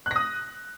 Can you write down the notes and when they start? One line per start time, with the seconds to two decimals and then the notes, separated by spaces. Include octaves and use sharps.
0.06 F#6
0.11 A#6
0.16 D#6